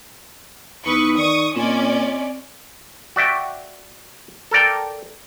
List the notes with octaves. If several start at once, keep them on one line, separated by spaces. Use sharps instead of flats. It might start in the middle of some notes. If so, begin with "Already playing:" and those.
E2 D#4 B4 C#6 D#6 E6
D#3 D5 C#6 D#6
A#2 C4 C#4 D5 D#5
F#4 D5 E5 G5
A4 A#4 D5 G5